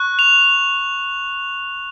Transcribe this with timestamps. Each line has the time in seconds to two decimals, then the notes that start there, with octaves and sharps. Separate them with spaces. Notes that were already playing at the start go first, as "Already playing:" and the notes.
Already playing: C#6 F#6
0.19 F7